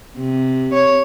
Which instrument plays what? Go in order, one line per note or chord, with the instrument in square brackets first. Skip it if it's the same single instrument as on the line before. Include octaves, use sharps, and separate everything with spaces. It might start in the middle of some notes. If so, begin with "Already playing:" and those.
[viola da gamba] C3
C#5